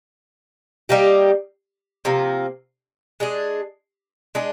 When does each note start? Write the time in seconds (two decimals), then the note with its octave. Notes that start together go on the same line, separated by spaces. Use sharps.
0.89 G3 A#3 D#4 G4
2.05 C3 F3 A#3
3.20 G#3 D4 G#4
4.35 G#3 D4 G#4